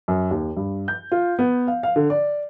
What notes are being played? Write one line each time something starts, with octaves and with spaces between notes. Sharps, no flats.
F#2
D#2
G2
G6
F4
B3
F5
F5
D3
D5